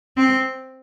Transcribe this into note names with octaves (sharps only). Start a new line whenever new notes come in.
C4